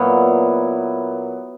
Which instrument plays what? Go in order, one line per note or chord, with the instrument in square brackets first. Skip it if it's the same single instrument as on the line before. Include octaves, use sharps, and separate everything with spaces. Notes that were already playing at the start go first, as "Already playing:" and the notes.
Already playing: [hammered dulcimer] A#2 F#3 B3 E4